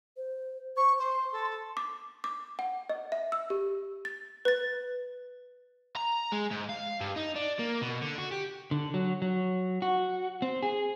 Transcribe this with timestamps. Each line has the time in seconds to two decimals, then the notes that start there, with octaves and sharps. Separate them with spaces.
0.17 C5
0.76 C5 C#6
0.99 C5 C6
1.32 A4
1.77 D6
2.24 D6
2.59 F#5
2.89 D#5
3.12 E5
3.32 E6
3.50 G4
4.05 A6
4.45 B4 A6
5.96 A#5
6.32 G#3
6.51 G#2
6.69 F5
7.00 G2
7.16 D#4
7.36 D4
7.60 A#3
7.82 B2
8.02 D3
8.18 F#4
8.32 G4
8.71 D3
8.94 F#3
9.22 F#3
9.82 F#4
10.42 C4
10.62 G#4